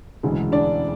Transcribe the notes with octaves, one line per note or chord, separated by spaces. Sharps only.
E1 D2 C#3 E3 G#3
D4 D5